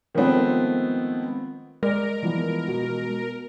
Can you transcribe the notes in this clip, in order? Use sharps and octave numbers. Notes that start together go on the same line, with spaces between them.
D#3 F3 G#3 A3 B3 C4
G#3 A#4 D5
E3 F3 B3
B2